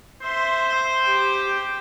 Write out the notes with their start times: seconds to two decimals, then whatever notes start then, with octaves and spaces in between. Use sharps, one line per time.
0.22 C5 E5 C6
1.02 G4 G5